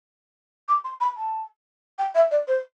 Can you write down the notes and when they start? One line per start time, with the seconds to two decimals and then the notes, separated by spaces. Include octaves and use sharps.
0.68 D6
0.84 C6
1.01 B5
1.17 A5
1.98 G5
2.15 E5
2.31 D5
2.47 C5